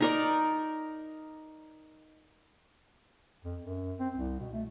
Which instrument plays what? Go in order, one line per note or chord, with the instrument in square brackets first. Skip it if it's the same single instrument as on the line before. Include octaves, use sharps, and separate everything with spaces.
[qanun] D#4 A#4 D5
[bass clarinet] F2
F#2
C4
C2
B2
A3